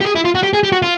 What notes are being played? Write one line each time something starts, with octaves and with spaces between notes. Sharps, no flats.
G4
G#4
E4
F4
F#4
G4
G#4
G4
F#4
F4